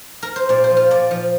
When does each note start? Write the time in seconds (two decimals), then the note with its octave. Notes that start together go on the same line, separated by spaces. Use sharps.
0.23 A#4
0.36 C5
0.49 A#2 D5
0.64 C5
0.70 F3
0.77 F4
0.91 A#2 D5
1.11 F3